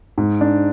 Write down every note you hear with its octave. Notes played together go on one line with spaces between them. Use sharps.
G#2
D4